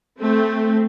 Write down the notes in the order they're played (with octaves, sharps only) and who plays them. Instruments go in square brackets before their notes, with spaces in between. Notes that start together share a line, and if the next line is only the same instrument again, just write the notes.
[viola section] A3 C4